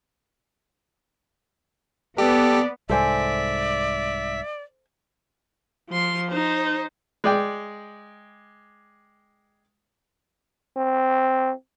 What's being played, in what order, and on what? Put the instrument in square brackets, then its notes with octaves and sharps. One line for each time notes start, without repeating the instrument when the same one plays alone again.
[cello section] B3 [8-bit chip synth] G4 [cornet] A4 [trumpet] D5
[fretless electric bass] C2 G#2 [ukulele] A4 C5 G#5 [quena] D5 [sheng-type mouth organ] E5
[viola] F3 C6
D#4 C5
[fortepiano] G#3 D5 G5
[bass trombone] C4